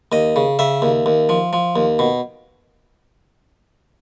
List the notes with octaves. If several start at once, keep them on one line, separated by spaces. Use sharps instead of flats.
D#2 D#5
C#3
C#3 E5
D#2
D#2
F3
F3
D#2
B2